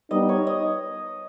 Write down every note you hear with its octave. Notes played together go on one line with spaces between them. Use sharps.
G3 B3 D#4 D#5
C#5
D#5